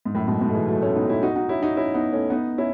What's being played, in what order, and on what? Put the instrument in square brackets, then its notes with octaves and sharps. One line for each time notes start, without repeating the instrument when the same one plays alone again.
[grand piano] G#2
F#2 A2
G#2 B2
G#2 B2
A3
E3 G#3
F#3 A3
A3 C#4
B3 D#4
C#4 E4
D#4 F#4
D#4 F#4
C#4 E4
D#4 F#4
C#4 E4
B3 D#4
A3 C#4
B3 D#4
C#4 E4